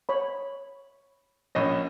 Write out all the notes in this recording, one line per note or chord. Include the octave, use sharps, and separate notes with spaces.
C#5 B5
A#1 C#4 C#5 D#5